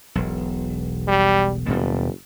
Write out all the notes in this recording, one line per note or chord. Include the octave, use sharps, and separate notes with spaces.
E1 B1
G3
F#1 D#2 B2 G3